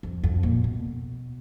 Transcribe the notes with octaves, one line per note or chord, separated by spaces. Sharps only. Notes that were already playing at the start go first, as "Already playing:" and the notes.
F2
F2
A#2
B2